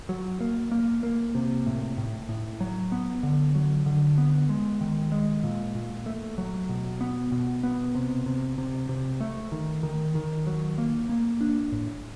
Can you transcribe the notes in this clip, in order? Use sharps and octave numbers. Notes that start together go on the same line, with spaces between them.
F#3
A#3
A#3
A#3
C3
A2
A2
A2
F#3
B3
D3
F#3
D3
B3
G#3
D#3
G#3
A#2
A#2
A3
F#3
B2
B3
B2
B3
C3
C3
C3
C3
A3
D#3
D#3
D#3
F#3
A#3
A#3
D4
A2